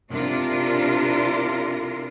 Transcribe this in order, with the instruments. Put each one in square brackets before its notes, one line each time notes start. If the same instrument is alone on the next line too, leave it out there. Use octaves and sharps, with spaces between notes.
[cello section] C3 D4 E4 F4 A#4